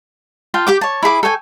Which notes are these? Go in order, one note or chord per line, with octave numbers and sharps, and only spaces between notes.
F4 G5 A5
G4 G5 D6
C#5 A5
E4 G#4 B5 D6
A4 C#5 G5 G#5